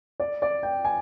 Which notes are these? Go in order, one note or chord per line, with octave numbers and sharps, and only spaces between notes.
D5
D5
G5
G#5